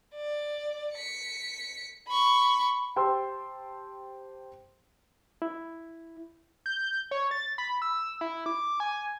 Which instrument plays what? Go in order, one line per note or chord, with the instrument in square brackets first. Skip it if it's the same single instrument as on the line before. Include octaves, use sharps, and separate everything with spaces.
[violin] D5
B6 C#7
B5 C#6
[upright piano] G4 C5 G5 A5 C6 E6
[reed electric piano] E4
[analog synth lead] G6
C#5
A6
B5
E6
E4
D6
G#5